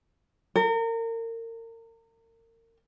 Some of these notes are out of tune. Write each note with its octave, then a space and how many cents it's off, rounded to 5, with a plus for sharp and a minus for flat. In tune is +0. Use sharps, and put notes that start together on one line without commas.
A#4 -35